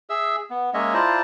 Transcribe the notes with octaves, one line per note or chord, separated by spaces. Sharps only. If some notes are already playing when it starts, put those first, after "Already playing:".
G#4 E5 E6
B3
G#3 A#3 C#4 C#5 D#5 E5
E4 F4 C5 D5 A5 A#5